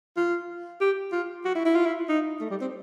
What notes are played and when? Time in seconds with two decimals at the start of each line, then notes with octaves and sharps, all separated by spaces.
0.17 F4
0.81 G4
1.12 F4
1.45 F#4
1.55 E4
1.65 E4
1.75 F4
1.86 E4
2.09 D#4
2.41 A3
2.50 G3
2.61 C4